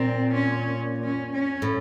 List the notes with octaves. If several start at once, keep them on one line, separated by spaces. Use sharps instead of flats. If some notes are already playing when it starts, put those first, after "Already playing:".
Already playing: A#2 C4
C#4
C#4
C#4
A2